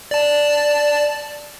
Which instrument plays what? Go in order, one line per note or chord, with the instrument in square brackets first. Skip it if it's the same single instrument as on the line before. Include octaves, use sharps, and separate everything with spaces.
[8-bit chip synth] D5 A5